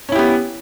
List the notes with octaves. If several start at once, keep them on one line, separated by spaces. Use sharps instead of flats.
B3 C#4 E4 G4